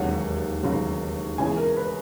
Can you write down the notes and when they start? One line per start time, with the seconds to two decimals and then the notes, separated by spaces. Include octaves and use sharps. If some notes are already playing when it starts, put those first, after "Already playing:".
Already playing: E1 D#2 C#3 F#3 F#5
0.63 E1 D#2 C#3 F#3
1.38 E1 E2 C#3 E3 G#5
1.57 A#4
1.76 B4